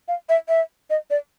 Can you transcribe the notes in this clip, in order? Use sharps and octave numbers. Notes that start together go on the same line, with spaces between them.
F5
E5
E5
D#5
D5